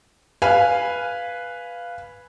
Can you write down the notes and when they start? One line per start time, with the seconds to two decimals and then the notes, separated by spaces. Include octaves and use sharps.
0.42 B4 F5 G#5